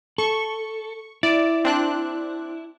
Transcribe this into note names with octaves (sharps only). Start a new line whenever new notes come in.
A4 C#6
E4 D5
C4 D4 F#6